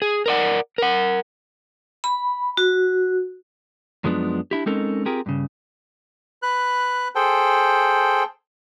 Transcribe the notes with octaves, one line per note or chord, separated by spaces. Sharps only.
G#4
A#4 D5 F#5
A#4 F#5
B5
F#4
F#2 F3 G#3 B3 C#4 D4
D4 E4 G4
G#3 C4 C#4 D#4 A4 A#4
C4 F4 G4 G#4 A#4
G2 C#3
B4 F#6
G#4 A4 C5 G5